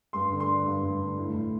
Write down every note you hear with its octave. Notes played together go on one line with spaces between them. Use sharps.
G2 C6
D3
C6
D4
G2
G2
D3
A2
A2